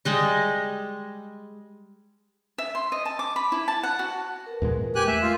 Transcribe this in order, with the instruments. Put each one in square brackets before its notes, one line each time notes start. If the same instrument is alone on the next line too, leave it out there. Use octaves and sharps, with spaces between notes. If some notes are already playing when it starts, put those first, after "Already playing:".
[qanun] G3 G#3 D#5
[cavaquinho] E5
C6
D#5
A5
D6
B5
E4
A5
F#5
F#4
[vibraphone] A#4 B4
[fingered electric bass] E2 A#2 G#3
[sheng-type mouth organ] G4 G#5 F#6
[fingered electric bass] A3 [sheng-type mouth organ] E5
[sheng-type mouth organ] F4